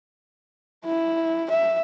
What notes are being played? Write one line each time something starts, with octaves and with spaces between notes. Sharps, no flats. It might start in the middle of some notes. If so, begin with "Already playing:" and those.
E4
E5